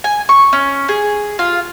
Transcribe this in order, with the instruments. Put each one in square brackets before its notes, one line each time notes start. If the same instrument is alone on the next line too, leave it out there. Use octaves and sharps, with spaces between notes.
[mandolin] G#5
C#6
C#4
G#4
F4